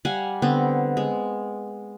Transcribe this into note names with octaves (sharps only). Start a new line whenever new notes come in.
G3 F5 F#5 G#5
D3 B3 C4
G#3